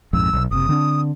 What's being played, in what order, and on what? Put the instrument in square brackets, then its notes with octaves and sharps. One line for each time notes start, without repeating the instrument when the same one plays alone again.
[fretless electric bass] A#1 F2 G#2 [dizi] E6
[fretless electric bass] B1
[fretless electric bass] F#1 C3 [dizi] D#6
[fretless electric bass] D3 C4 D4